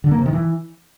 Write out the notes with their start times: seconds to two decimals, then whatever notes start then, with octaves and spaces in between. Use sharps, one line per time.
0.04 D3
0.11 A#3
0.18 C3
0.26 D#3
0.33 E3